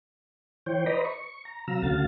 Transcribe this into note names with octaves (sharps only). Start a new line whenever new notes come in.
E3 C5 C#5 G5
B4 C5 D5 D#5 A#5 B5
C#6
A#5
C3 F#3 F5 A#5 E6
D2 C#3 A3 F#4 F5 A6